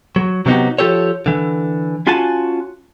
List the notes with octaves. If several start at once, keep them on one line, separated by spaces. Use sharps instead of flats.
F#3
C3 F#3 B3 D#4 F#4 G4
F3 F4 G4 A4 C#5
D3 E3
C#4 F4 F#4 G#5 A5